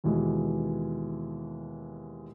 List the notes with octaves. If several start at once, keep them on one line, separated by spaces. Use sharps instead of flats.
D#2 B2 E3 G#3